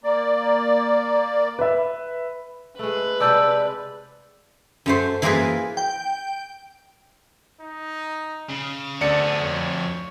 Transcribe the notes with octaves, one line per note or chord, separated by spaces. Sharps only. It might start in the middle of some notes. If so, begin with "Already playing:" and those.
A#3 D5
B4 E5
G#3 A3 B4
C3 G#3 D5 A5 E6 G6
F#2 A3 C5
E3 A#3 F4 G#4 B4
G5
D#4
C#3
D2 B3 G#4 A4 D5 C#7
F2 C#5